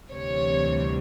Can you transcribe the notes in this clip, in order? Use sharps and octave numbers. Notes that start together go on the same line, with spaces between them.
D2 C3 E3 G3 C#5